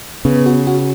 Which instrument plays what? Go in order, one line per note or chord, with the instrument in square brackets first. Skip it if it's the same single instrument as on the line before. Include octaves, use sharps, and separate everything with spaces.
[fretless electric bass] C#3 [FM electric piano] B3
[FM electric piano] F#4
F#4